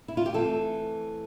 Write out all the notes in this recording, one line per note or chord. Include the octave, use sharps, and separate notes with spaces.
E4
F4
G4
E3 A3 C4 A4